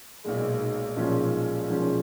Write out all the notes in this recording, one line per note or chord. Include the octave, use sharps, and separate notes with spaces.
B1 A#2 G#3
B1 A#2 F3 G#3 C#4
B1 A#2 F3 G#3 C#4